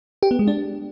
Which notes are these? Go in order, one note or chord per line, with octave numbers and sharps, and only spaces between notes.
G4
B3
G#3
D4